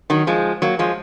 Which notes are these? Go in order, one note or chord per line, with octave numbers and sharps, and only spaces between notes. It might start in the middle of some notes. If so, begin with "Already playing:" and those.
D#3 F#3
F3 G#3
F#3 A#3
F3 G#3